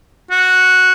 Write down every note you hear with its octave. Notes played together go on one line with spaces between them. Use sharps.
F#4